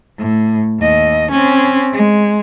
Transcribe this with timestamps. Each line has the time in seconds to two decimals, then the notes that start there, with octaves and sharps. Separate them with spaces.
0.18 A2
0.80 D#2 D#5
1.31 C4 C#4
1.93 G#3